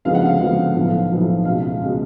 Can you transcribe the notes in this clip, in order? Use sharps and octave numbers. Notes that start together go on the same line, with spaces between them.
D2 C#3 F3 G#3 B3 F5
F#5
F5
D2 C#3 F3 G#3 B3
B1 A2 F3 B3
B1 A2 F3 B3
C#2 B2 G#3 F5
C#2 B2 G#3